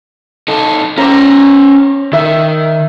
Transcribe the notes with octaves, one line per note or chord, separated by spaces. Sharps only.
D#4 A4
C#4 C5 A#5 D6
D#3 E5